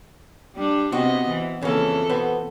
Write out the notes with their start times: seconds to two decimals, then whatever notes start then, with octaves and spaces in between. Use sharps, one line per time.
0.56 G3 D4
0.92 C3 B3 C4 F#4 D#5
1.28 E3
1.62 F2 C#3 E3 A#3 A4
2.09 B2 B3 C4